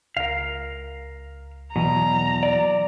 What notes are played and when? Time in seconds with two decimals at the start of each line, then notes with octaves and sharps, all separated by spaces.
0.17 C#2 A#4 F5
1.76 E2 B2 E3 F#3 A#5
2.43 D5